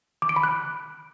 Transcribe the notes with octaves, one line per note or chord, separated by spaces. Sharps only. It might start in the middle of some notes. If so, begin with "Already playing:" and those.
D6
D7
B5
F#6